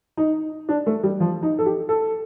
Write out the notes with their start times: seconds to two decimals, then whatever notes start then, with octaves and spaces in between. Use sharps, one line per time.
0.17 D#4
0.69 D4
0.87 A3
1.03 G3
1.20 F3
1.43 D#4
1.58 A4
1.66 G4
1.89 A4